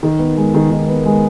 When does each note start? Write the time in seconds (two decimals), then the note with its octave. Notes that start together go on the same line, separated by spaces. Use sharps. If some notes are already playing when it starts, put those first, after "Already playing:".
0.03 D#3
0.19 B3
0.37 G#3
0.54 D#3
0.71 D#3
0.88 B3
1.05 G#3